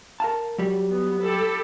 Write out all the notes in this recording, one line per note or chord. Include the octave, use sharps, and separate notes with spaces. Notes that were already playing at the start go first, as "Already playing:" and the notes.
A#4 F5 A5
F#3 G3
B3
G4 A4 B5